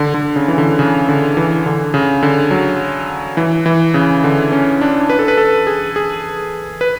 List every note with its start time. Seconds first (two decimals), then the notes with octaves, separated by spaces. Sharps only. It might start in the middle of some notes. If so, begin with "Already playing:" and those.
Already playing: D3
0.14 D3
0.36 C#3
0.48 E3
0.58 D3
0.79 C#3
1.09 D3
1.37 E3
1.66 D3
1.94 C#3
2.23 D3
2.51 F#3
3.37 E3
3.66 E3
3.94 C#3
4.24 D3
4.52 C#4
4.81 D4
5.10 B4
5.19 A4
5.28 B4
5.38 A4
5.67 G#4
5.96 G#4
6.81 B4